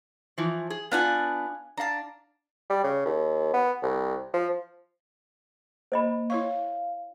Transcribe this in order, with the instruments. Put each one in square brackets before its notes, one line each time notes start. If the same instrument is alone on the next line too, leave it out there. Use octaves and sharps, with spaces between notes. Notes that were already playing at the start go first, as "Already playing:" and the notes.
[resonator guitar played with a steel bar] E3 F3
G#4
[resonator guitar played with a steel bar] B3 D4 F4 [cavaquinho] F5 F#5 G#5
[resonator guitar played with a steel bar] D4 F5 [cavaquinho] A5 A#5
[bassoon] G3
C#3
D#2
B3
C2
F3
[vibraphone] A#3 [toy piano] C5 D#5 B5
[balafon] E4 C#5 C#6 [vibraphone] F5